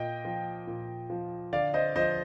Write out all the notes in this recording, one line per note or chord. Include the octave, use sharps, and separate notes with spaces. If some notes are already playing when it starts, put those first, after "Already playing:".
Already playing: A#2 D#5 G5
F3
A#2
F3
D3 D5 F5
C5 D#5
F3 C5 D#5